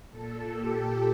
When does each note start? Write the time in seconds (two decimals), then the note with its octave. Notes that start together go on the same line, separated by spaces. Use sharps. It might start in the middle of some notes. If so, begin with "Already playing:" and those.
0.10 A#2 A4
0.52 G4